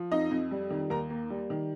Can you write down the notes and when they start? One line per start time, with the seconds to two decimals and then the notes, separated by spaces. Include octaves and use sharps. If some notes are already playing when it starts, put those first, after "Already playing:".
Already playing: F3
0.11 F2 D#4 D#5
0.31 F2
0.51 G3
0.70 D#3
0.90 D#2 A#4 A#5
1.10 A#3
1.30 G3
1.50 D#3